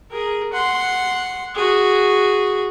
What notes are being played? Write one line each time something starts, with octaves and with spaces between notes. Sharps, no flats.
G#4 A#4
F#5 C6
F#4 G#4